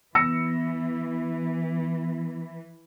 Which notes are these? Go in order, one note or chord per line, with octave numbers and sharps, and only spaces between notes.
E3 B3 E6 A#6 C#7